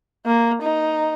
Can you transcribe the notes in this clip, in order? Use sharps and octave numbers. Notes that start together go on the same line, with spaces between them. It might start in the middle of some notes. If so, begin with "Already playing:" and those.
A#3
D#4